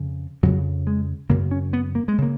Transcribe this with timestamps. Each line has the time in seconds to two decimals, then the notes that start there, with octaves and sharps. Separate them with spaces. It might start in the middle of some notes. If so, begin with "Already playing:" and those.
Already playing: F2 C#3
0.43 F2 C#3 F#3
0.87 G#3
1.29 F#2 C#3 A#3
1.51 C#4
1.73 B3
1.95 A#3
2.08 G#3
2.18 C#3 A#3